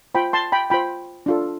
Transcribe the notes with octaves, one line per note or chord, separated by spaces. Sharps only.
F4 C5 G5 B5
A5 C6
G5 B5
F4 C5 G5 B5
D4 F4 A4